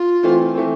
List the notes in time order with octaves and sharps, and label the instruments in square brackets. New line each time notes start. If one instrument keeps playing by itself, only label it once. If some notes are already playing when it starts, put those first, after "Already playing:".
Already playing: [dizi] F4
[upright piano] E3 A3 C4
[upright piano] E3 A3 C4 [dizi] A4